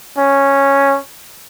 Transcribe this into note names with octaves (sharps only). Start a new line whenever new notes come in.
C#4